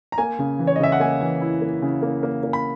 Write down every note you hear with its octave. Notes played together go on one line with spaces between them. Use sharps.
A#5
A#3 G#5
C#3
E3
C#5
D#5
C#3 E5
F#5
A#3 G#5
E3
E4
A#3
C#3
A#3
A#3
A#3
B5